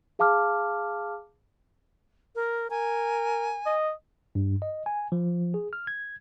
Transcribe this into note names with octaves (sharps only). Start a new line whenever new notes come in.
G#4 F5 A5 D6 F6
A#4
A#4 G#5
D#5
G2
D#5
G#5
F3
G#4
F6
G#6